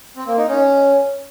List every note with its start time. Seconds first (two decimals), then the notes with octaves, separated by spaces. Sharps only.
0.16 C4
0.27 A#3
0.38 D#4
0.49 C#4